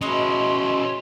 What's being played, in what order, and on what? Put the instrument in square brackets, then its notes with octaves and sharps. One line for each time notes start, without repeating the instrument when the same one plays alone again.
[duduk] B2 [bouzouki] G#3 D#5 [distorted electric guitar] C#4 E4 [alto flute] C6